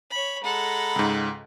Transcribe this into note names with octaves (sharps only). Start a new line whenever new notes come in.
C#5 B5
G#3 A4 F#5 A#5 B5
C#2 G#2